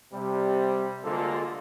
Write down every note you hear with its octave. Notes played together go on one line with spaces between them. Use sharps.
C3 G3
D2 D3 G#3 A#3 F4 A4